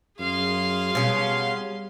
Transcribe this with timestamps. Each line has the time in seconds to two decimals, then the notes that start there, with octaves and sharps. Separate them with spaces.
0.19 F#2 G#4 F5 C6 F6
0.95 B2 G3 C#4 F4